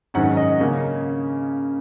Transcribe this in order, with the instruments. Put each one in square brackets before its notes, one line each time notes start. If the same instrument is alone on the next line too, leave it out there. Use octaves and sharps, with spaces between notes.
[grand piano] G#2 D#3 F#3 C#4 F#5
D#5
C#3 A#3 C#4